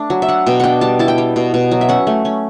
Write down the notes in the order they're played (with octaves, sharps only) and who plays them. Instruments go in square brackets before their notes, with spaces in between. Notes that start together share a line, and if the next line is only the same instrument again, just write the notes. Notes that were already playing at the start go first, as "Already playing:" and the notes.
Already playing: [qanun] A3 D4 D5
F#3
E5
D4 F#5
B2 G5
D4 F#5 G5
G3 A5
E4 A5
G5
G3
B2
B2
F#3
E5
C#4 F#5
A3
C#4